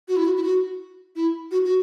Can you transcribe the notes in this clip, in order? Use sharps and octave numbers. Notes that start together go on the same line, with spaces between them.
F#4
E4
F#4
E4
F#4
E4
F#4
F#4